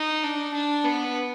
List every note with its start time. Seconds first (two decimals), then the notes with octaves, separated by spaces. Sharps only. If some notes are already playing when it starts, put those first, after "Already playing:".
Already playing: D#4
0.24 D4
0.55 D4
0.85 B3